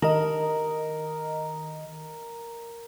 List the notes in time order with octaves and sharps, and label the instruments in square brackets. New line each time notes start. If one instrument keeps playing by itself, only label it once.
[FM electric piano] D#3 D#5 [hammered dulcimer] A#4